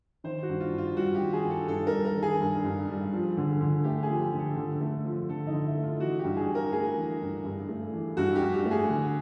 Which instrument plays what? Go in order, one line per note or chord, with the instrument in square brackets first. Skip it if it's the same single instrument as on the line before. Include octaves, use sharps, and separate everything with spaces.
[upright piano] D#3 [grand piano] C5
[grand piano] F#4
[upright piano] G2
[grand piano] F4
[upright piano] G2
[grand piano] F4
[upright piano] G3 [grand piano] F#4
[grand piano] G4
[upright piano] D#3
[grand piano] G#4
[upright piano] G2
[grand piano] A4
[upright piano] G2 [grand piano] A4
[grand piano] A#4
[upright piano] G3
[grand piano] A#4
[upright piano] D#3
[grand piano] G#4
[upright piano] G2
G2
G3
F3
D3
D3
[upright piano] A3 [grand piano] G4
[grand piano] G#4
[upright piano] F3
[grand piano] G4
[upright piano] D3
[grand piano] A4
[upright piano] D3
A3
F3
[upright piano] D3 [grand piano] A4
[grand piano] D#4
[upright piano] D3
[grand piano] E4
[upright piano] A3
[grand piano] F4
[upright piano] E3 [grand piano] F#4
[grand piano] G4
[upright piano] G2
[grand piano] G#4
[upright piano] G2
[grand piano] A#4
[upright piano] A3 [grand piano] G#4
[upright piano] E3
G2
G2
A3
E3
[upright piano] G2 [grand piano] F#4
[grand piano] G4
[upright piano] G2
[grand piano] G4
[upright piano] A3
[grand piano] G#4
[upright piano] D3